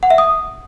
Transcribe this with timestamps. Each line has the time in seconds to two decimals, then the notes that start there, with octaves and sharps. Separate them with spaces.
0.03 F#5
0.10 E5
0.18 D#6